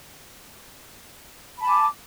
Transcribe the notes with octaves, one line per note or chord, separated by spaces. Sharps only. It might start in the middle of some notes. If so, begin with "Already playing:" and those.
G#5 A5 B5 D6